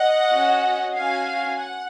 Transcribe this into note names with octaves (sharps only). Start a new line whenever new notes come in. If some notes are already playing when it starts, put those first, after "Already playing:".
Already playing: D#5 F#5
C#4 F#4
C#4 F#4 F5 G#5
F#5